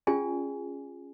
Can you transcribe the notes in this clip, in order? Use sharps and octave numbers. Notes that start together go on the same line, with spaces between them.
C#4 F4 G#4 D5 G#5